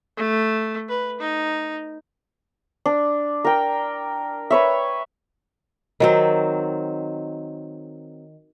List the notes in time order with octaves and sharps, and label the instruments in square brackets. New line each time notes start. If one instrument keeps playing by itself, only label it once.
[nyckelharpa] A3
B4
D#4
[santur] D4
A#4 G5
B4 C#5 E5
[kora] D#3 F#3 C4